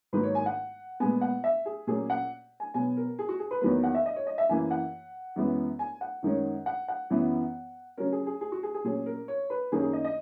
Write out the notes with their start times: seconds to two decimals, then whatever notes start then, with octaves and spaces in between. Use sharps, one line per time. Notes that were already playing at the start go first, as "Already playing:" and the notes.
0.13 G#2 D#3 F#3 A#3 B4
0.23 C#5
0.35 G#5
0.46 F#5
1.00 A#2 G#3 B3 G#5
1.21 F#5
1.44 E5
1.65 G#4
1.87 A#2 F#3 A#3 C#4 G#4
2.10 F#5
2.60 G#5
2.74 B2 F#3 B3 G#5
2.97 A#4
3.19 G#4
3.29 F#4
3.39 G#4
3.51 B4
3.61 E2 D#3 F#3 A#3 B4
3.84 F#5
3.94 E5
4.06 D#5
4.16 C#5
4.27 D#5
4.38 E5
4.49 F#2 E3 A#3 G#5
4.71 F#5
5.36 F#2 E3 G#3 B3
5.79 G#5
6.01 F#5
6.23 F#2 D#3 G#3 C#4
6.66 F#5
6.88 F#5
7.10 F#2 E3 B3
7.97 C#3 F#3 C#4 A#4
8.12 G#4
8.26 G#4
8.41 G#4
8.52 F#4
8.63 G#4
8.74 G#4
8.84 A#2 F#3 C#4 G#4
9.06 A#4
9.28 C#5
9.50 B4
9.72 F#2 D#3 A#3 C#4 G#4
9.82 G#4
9.93 D#5
10.04 D#5